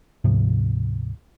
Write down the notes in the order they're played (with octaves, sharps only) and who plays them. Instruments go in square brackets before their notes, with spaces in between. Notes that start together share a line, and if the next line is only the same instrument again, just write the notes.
[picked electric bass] D2 G#2 C3 F3